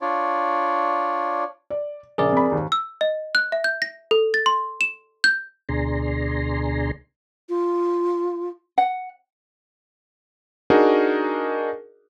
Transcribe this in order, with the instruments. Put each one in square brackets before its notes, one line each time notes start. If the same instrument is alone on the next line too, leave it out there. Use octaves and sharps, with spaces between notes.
[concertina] D4 F4 C#5 D5
[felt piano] D5
[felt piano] A#1 C#3 [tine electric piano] G#4 A#4 D5
[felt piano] F2 B5
D#2 G#2
[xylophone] E6
D#5
F#6
E5
G6
A#6
A4
A6
C6
E7
G6
[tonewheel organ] D2 B2 D4 G#4 A#5 C6
[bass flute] F4
[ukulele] F#5
[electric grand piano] D4 D#4 F#4 G#4 A#4